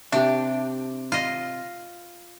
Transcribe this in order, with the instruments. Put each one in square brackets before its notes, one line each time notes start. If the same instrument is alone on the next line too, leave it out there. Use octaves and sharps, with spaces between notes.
[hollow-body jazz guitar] C3 G4 [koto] D4 [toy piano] E5
[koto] F4 D#5